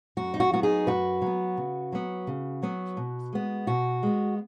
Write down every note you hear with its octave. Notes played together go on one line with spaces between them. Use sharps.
F#2 F#4
D#4
F#4
F#3 B3 F#4
D#4 G#4
F#2 F#4 B4
F#3 B3
C#3
F#3 B3
C#3
F#3 B3
B2
G#3 B3
B2 F#4
G#3 B3